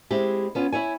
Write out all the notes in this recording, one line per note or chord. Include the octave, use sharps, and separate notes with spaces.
G#3 C4 E4 G4
B3 C#4 F4
E4 C#5 G#5